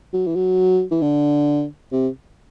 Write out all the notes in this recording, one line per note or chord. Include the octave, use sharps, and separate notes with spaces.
F#3
E3
F#3
E3
D3
C3